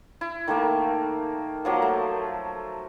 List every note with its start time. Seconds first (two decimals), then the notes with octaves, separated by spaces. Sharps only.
0.21 E4
0.48 D#3 A3 A#3
1.65 F3 F#3 A#3
1.82 A3